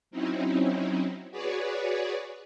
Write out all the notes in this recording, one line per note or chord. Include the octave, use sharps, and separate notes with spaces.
F#3 C4 C#4 D#4 E4
F#4 G#4 B4 C#5 D5